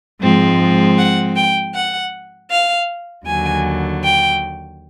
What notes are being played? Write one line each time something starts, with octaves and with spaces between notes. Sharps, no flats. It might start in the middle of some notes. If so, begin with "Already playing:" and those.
G#2 F3 G#3 C4
F#5
G5
F#5
F5
D#2 D3 F#3 G#5
G5